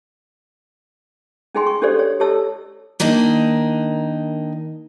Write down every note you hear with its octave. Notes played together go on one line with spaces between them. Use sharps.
C#4 D#4 G#4 G5 G#5 C6
C#6
C#4 D4 G4 A4 C5 D5
C#5
G4 A4 C#5 D#5 A5 E6
D#3 A#3 D4 D#4